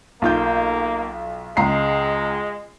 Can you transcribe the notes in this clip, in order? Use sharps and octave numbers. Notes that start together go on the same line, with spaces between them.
B1 A#3 F4 G6
C#2 G#3 A#5 C7